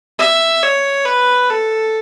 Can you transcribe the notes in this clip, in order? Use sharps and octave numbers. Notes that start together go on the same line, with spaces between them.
E5
C#5
B4
A4